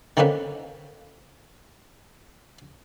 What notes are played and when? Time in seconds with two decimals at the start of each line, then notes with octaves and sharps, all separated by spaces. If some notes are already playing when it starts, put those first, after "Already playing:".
0.17 D3 D#3 A#3 C4 C#4 B4